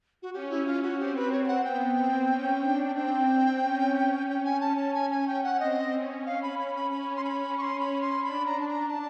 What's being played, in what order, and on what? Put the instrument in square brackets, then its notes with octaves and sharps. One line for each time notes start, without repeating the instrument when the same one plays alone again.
[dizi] F#4
[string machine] C#4 [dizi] G4
[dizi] E4
F4
F#4
[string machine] C4 [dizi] G4
[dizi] B4
C#5
G5
F#5
[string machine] B3 [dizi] G5
[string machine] C4
C#4
D4
[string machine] C4 [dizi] G5
[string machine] C#4
C#4
[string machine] C#4 [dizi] G5
[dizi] G#5
A5
A5
G#5
G#5
G5
F#5
[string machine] C4 [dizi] D#5
[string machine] C#4
[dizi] F5
B5
B5
B5
[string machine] C#4 [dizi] B5
[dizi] C6
B5
C#6
C6
B5
C6
[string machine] D4 [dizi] B5
[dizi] A#5
A5
A#5
A5